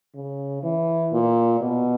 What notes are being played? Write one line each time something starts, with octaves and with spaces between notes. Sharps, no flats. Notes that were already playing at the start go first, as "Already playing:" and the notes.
C#3
E3
A#2
B2